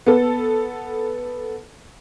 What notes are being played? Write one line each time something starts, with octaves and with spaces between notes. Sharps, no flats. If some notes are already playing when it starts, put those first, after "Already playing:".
B3 A4